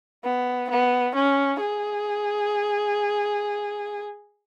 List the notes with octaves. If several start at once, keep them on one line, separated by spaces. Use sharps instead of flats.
B3
B3
C#4
G#4